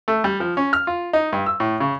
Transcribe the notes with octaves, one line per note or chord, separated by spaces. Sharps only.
A3
G3
F3
C#4
F6
F4
D#4
G2
E6
A2
C#3